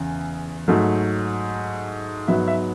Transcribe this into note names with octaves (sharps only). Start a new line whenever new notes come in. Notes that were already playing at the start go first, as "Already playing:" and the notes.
Already playing: E2 C#3
G#2 F#3 A3
G#2 F#3 B3 E5
E5